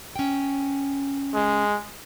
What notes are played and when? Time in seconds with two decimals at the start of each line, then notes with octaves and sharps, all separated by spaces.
0.16 C#4 G5
1.34 G#3